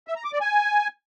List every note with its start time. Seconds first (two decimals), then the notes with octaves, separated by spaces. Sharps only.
0.08 E5
0.16 A#5
0.24 D6
0.33 D5
0.41 G#5